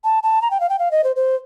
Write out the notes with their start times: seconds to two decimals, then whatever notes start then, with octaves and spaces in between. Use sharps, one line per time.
0.04 A5
0.23 A5
0.42 A#5
0.51 G5
0.60 F5
0.69 G5
0.79 F5
0.91 D#5
1.04 C5
1.16 C5